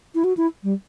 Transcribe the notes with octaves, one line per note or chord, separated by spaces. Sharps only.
E4
F#4
E4
G3